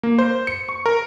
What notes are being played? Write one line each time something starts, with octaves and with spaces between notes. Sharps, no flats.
A#3
C5
C#7
C#6
A#4